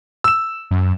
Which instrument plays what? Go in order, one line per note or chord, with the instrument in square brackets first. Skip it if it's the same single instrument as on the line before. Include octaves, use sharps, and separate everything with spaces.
[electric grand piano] E6 E7
[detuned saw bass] F#2